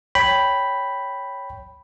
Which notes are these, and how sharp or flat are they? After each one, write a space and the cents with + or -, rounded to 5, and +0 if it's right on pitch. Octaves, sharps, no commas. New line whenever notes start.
C#5 +0 G5 +0 B5 +0